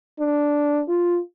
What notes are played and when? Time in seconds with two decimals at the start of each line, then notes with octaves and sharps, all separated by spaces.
0.20 D4
0.88 F4